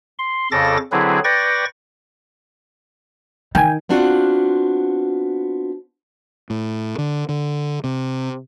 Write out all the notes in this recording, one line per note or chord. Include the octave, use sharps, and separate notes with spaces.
C6
F2 C#3 A4 D6 A6 A#6
D3 F#3 C4 E4 G#4 B4
B4 D5 G5 C#6 A6 A#6
D#3 G5 G#5
B3 C4 D4 F4 F#4
A2
D3
D3
C3